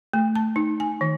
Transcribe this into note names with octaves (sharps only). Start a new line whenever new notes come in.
A3
A5
D#4
G#5
D#3